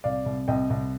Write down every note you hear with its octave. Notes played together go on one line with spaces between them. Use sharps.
C2 D5 F5
C2
C2 D#5 G5
C2